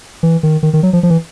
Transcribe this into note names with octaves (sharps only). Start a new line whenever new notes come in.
E3
D#3
D#3
D#3
F#3
F3
F3
E3